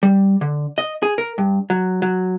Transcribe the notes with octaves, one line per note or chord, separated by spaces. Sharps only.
G3
D3
D#5
G#4
A#4
G2
F#3
F#3